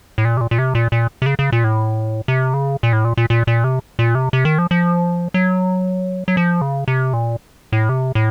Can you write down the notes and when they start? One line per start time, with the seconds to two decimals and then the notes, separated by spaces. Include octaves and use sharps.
0.18 A2
0.25 A#2
0.37 C3
0.41 A#2
0.51 A#2
0.59 C3
0.75 A#2
0.92 A#2
1.22 C3
1.26 C#3
1.39 C#3
1.52 A#2
1.64 A2
2.28 C3
2.54 C#3
2.83 A#2
2.93 A2
3.05 A#2
3.17 A#2
3.30 A#2
3.47 A#2
3.64 C3
3.99 A#2
4.15 C3
4.33 C3
4.45 D#3
4.58 F3
4.71 F3
5.34 F#3
6.28 F#3
6.37 F3
6.61 C#3
6.88 C3
7.13 A#2
7.72 A2
7.89 C3
8.15 A2